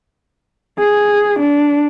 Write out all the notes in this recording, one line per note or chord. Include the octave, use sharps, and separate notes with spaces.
G#4
D4